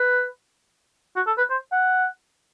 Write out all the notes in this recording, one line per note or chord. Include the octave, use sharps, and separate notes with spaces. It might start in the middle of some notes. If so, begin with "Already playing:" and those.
Already playing: B4
F#4
A4
B4
C5
F#5